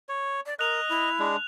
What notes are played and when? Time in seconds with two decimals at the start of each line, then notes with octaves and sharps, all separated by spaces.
0.09 C#5
0.46 D5
0.59 A#4 D#5 F#6 F7
0.89 E4
1.19 G#3 D4